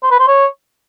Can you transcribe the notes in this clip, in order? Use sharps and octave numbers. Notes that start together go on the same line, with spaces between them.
C5
B4
C5
C#5